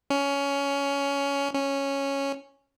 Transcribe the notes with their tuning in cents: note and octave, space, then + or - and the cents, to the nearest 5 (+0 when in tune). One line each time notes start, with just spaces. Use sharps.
C#4 +15
C#4 -5